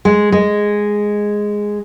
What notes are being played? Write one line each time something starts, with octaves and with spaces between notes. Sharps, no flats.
G#3
G#3